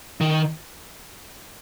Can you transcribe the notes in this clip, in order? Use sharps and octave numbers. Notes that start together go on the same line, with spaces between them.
D#3